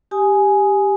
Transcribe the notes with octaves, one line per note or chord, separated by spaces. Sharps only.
G4 G#5 D#6